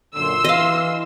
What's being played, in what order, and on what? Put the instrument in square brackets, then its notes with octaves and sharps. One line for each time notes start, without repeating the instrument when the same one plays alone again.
[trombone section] F#2 A#2 D3 [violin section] C6 E6
[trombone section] E3 [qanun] D#5 F5